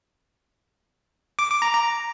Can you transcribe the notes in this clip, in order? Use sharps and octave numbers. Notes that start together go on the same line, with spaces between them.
D6
D6
A#5
A#5